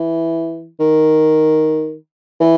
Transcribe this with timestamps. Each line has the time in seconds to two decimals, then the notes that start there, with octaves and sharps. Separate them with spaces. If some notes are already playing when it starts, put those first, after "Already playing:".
Already playing: E3
0.80 D#3
2.40 E3